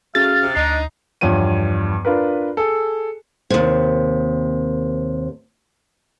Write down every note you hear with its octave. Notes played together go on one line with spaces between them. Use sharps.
F#3 A3 C#4 F#4 G#4 F5 A6
C3
D2 D4 D#4 C7
E2 G2 F3 C#5 D#7
D4 F4 A#4 B4
G#4 A4
D#2 C3